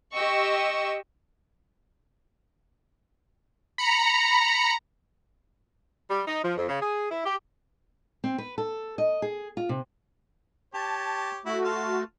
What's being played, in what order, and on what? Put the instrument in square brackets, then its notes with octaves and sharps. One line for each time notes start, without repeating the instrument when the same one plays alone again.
[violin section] G4 D#5 C#6 E6
[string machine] A#5 [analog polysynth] B5 C#7
[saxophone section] G3
D#4
F3
F2
C#3
G#4
E4
G4
[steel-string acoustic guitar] C4
B4
A4
D#5
G#4
F4
C3
[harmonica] G4 C#5 [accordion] A5
[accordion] A3 F#4 [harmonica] E4
[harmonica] F4 A5 F6